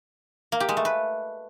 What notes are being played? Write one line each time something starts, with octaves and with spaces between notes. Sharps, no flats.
A#3
G4
G#3
A3
B4